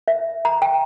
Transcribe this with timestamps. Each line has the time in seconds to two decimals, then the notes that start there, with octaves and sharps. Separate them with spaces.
0.08 E5
0.45 A#5
0.62 G5